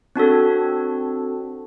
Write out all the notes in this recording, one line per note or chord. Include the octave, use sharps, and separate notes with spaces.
C4 D4 F#4 A4